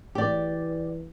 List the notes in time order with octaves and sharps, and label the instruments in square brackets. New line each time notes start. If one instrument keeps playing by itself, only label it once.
[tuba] E3 [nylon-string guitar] G4 D5